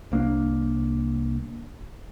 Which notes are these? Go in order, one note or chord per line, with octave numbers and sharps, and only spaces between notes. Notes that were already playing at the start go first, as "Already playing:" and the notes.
C2 A#3 C4 D4